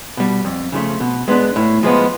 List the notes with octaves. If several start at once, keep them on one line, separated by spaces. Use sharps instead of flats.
B2 G3
F2
C#3 F3 A3
B2
G#3 B3 D4
A2
F3 G#3 B3